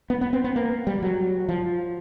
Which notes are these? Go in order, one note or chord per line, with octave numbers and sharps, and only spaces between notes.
B3
B3
C4
B3
A#3
G3
F#3
F3